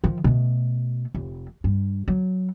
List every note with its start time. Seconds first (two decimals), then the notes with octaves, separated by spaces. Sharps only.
0.04 D#3 F3
0.24 B2 A3
1.14 F1
1.64 G2
2.08 F#3